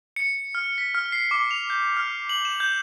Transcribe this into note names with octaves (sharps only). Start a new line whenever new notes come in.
C#7
F6
B6
F6
C7
D6
F7
G6
F6
F#7
E7
G6